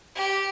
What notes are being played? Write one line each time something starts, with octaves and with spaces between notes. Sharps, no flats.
G4